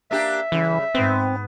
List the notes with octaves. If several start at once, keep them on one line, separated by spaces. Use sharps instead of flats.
A#3 D4 G4 E5
C#3 E3 G3
G#2 B3 C4